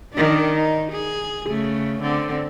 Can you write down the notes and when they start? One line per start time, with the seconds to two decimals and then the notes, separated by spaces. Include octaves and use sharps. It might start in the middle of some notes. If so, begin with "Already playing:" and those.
0.13 D#3 D4
0.55 D#4
0.92 G#4
1.47 C#3 A3
2.01 D3 C4